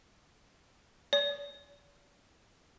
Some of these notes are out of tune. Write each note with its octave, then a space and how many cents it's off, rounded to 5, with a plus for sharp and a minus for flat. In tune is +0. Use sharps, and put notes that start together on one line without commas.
D5 -45